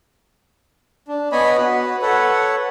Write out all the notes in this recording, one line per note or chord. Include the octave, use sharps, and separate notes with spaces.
D4
B3 C#5 D#5 G#5 B5
F#4 B4
A4 B4 C#5 F#5